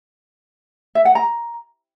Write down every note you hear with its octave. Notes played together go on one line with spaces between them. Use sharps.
E5
F#5
A#5